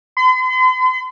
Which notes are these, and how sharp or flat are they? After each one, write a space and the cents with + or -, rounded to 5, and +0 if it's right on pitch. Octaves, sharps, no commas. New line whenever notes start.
C6 -45